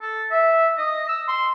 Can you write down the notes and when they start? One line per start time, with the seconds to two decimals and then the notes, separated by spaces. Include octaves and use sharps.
0.02 A4
0.31 E5
0.78 D#5
1.09 E6
1.28 C6